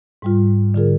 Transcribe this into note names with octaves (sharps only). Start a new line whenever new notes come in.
G#2 G3 F4
D3 F4 G#4 A#4